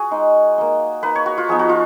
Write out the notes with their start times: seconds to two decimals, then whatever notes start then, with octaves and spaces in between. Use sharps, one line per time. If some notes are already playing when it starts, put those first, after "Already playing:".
Already playing: F#4 G#4
0.11 G#3 D#4
0.58 A#3 D#4
1.03 A#3 D#4 B4
1.15 C#5
1.26 F#4
1.38 F4
1.49 F3 B3 D#4 G#4
1.59 F#4
1.69 F4